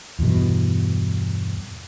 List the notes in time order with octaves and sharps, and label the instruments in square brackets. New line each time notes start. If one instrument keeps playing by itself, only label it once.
[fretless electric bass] E2 G2 B2